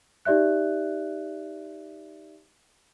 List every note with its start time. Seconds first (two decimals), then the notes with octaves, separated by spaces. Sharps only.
0.25 D#4 G4 D5 E5 F#6